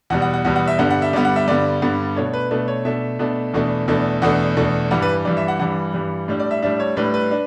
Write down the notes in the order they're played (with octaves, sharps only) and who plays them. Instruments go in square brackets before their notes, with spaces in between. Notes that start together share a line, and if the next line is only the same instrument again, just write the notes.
[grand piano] E2 B2 G3 F#5
F#5
F#5
E2 B2 G3 F#5
F#5
E5
G2 D3 G3 B3 F#5
F#5
E5
G2 D3 G3 B3 D5
F#5
E5
G2 D3 G3 B3 D5
G2 D3 G3 B3
B2 A3 D4 C#5
B4
B2 A3 D4 B4
C#5
B2 A3 D4 E5
B2 A3 D4
E2 B2 A3 D4
E2 B2 A3 D4
E2 B2 A3 D4 F#5
E2 B2 A3 D4
G2 E3 G3 F#5
B4
G2 E3 G3 D5
E5
F#5
G2 E3 G3 F#5
G2 E3 G3
A2 G3 D4
D5
E5
A2 G3 D4 E5
C#5
A2 G3 D4 B4
B4
D4